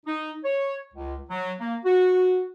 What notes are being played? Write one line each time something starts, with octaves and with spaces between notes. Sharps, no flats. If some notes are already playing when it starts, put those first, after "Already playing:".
D#4
C#5
C#2
F#3
A#3
F#4